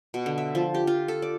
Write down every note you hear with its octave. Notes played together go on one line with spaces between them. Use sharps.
B2
D3
E5
F3
G4
F4
A4
D5